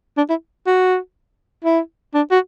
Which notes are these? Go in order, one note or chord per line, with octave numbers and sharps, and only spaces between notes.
D4
E4
F#4
E4
D4
F#4